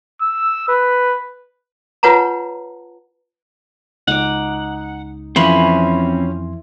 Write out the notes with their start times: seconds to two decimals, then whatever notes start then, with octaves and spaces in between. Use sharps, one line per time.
0.22 E6
0.68 B4
2.03 F4 B4 C#5 F#5 A5 A#5
4.07 C#2 D#4 F#5 D6
5.36 F2 E3 F3 C4 C#4 C#5 B5 C6